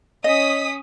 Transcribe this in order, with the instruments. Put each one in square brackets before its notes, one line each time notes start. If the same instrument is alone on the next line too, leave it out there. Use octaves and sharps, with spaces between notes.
[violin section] C#4 D#6 B6 [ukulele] D#5